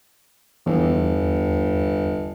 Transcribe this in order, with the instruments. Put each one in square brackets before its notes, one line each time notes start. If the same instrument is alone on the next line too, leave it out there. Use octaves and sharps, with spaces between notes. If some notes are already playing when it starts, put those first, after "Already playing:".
[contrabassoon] G1 [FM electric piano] E2